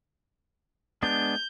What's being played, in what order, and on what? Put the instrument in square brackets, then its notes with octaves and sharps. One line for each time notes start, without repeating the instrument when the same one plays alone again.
[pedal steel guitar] G#3 B3 D4 [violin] G6